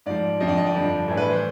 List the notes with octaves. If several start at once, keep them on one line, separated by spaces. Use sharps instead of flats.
G#2 F3 D5
F2 D3 F3 D#5
D5
D#5
D5
G2 D3 F3
A2 E3
B4
C5